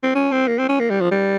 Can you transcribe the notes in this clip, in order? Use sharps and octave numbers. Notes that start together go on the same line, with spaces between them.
C4
C#4
C4
A#3
C4
C#4
A#3
G3
F3
G3